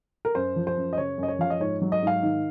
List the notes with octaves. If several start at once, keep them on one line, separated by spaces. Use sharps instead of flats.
A#4
F#2 C5
F3
C5
F#2
D#5
C#3 C#5
F#2 D#5
C#5
F3 F5
D#5
G#2 C#5
F#3
D#5
G#2 F5
D#3